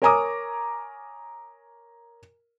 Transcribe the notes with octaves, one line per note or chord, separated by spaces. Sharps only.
A#4 C#5 G#5 A#5 D6 D#6